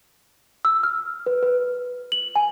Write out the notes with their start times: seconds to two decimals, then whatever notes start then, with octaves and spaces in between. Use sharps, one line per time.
0.65 E6
0.83 F6
1.26 B4
1.43 B4
2.12 F#7
2.36 G#5